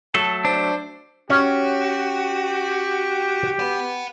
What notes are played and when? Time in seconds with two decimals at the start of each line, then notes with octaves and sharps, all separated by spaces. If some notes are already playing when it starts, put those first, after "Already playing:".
0.14 F#3 A3 A4 A5
0.45 D4 C5
1.30 C#4 F#4 G4
3.59 F#5 B5